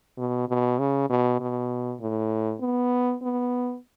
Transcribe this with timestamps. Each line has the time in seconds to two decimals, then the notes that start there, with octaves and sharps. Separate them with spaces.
0.18 B2
0.49 B2
0.79 C#3
1.10 B2
1.40 B2
2.00 A2
2.61 B3
3.22 B3